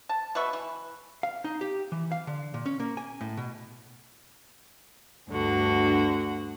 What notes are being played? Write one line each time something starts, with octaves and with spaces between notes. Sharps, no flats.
A5
B2 B4 E5 C#6
E3
F5
D#4
G4
E3
F5
D3
A#2
C#4
A#3
G#5
A2
B2
D2 G2 D3 F#4